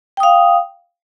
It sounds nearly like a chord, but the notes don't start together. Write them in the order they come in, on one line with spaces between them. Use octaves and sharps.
G5 D#6 F5